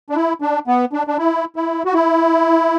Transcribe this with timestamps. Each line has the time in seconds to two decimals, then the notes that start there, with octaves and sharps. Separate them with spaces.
0.10 D4
0.16 E4
0.42 D4
0.67 B3
0.93 D4
1.07 D4
1.18 E4
1.56 E4
1.85 F#4
1.94 E4